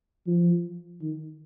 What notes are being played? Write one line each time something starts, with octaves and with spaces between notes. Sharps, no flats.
F3
D#3